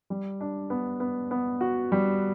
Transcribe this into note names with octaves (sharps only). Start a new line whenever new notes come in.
G3
D4
B3
B3
B3
F#4
G3